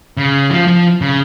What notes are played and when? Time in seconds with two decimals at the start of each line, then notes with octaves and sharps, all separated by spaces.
0.17 C#3
0.50 F3
0.67 F3
1.01 C#3